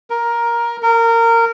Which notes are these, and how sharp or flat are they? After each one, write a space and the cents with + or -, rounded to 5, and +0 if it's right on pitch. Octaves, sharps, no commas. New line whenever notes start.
A#4 +10
A#4 -20